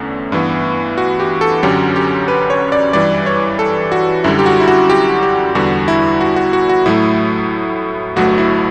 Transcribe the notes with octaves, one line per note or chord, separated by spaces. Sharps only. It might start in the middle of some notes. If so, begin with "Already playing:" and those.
Already playing: E2 D3 A3 C#4
G2 E3 B3
F#4
G4
A4
F#2 D3 F#3 C#4 G4
G4
B4
C#5
D5
G2 E3 G3 D5
C#5
A4
F#4
F#2 D3 G3 E4
G4
F#4
E4
F#4
G4
G4
E2 D3 G3 F#4
E4
F#4
F#4
F#4
F#4
A2 F#3 A3 E4
G1 G2 F#3 A3 F#4
E4